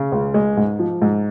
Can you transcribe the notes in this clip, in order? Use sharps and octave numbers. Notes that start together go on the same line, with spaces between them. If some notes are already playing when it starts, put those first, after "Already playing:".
Already playing: C#3
C#2
G#3
G#2
F3
G#2